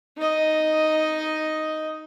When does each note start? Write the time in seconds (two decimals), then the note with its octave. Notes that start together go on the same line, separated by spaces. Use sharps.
0.18 D#4 D#5